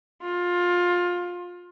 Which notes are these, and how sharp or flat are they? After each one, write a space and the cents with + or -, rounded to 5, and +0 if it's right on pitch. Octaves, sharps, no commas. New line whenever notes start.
F4 +20